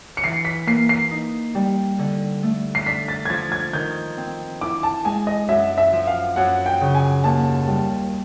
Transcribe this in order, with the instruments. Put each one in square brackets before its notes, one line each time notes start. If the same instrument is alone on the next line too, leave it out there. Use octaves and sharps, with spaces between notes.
[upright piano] C#7
[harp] E3 [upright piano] C7
[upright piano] B6
[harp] A#3 [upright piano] C7
[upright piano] C7
[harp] D#4
G3
D3
A3
[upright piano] C7
[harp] D4 [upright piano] B6
[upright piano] A6
G#6
[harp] F3 [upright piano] A6
[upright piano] G#6
[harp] D#3 [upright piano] G6
[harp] C4
[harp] E4 [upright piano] D6
[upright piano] A5
[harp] G#3 [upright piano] G#5
[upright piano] D#5
[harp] F#2 [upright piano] E5
[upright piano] E5
[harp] F3
[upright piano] F5
[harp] F#2 [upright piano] F#5
[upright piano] G5
[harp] C#3
[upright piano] G#5
[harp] D#2 [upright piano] A5
[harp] G3